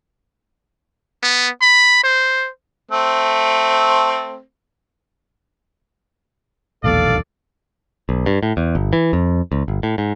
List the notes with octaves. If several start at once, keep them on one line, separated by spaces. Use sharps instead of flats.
B3
B5
C5
A3 C4
E1 A#1 D#2 A4 D5 F5
B1
G2
A2
E2
G1
E3
F2
C#2
G1
A2
G#2